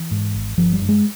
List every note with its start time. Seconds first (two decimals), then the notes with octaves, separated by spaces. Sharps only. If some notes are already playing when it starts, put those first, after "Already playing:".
Already playing: E3
0.11 G#2
0.34 G#1
0.57 G1 F3
0.73 G3
0.81 G2
0.89 G#3